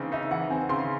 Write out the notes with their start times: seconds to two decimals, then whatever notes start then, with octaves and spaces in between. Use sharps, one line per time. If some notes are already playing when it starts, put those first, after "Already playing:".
Already playing: C#3 E3 C4 D#4
0.12 D#4 E5
0.31 E3 F#5
0.50 C4 G#5
0.69 C#3 C6